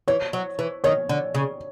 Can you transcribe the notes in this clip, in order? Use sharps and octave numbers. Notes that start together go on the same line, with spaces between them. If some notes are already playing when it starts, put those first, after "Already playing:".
E3 C#5
F#3
E3
D#3 C#5
D3
C#3